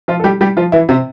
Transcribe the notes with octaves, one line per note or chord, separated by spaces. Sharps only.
F3 F4
A4
G3 G4
G3 G4
F3 F4
E3 E4
C3 C4